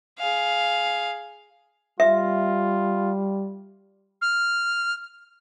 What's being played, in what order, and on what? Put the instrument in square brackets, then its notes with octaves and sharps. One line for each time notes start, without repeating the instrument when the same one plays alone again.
[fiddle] G#4 F5
[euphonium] G3 [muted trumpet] F4 [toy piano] E5
[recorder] F6